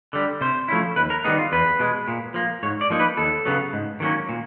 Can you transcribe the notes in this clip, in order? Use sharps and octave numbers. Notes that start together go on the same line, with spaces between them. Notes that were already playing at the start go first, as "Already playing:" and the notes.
D3 G3
C3 C5
F3 A3 C#4 E4
D#2 B4
A#4
D#3 G3 B3 D#4 G#4
F4
E2 B4
B2 G#3
A#2
F3 A#3
G#2 C#5
D5
F3 A#3 D#4
B4
D#2 A4
C#3 F#3 B3
G#2
D#3 F#3 A#3 C#4
A#2